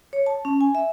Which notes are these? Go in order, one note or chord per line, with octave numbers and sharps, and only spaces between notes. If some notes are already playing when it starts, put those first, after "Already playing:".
C#5
A5
C#4
G#5
E5